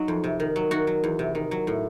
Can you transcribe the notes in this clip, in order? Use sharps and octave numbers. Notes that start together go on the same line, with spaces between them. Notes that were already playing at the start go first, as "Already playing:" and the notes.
Already playing: F#3 D#4 F#4
F2
C3
D#3
F#3
D#3 F#4
F#3
E2
C3
D#3
F#3
A2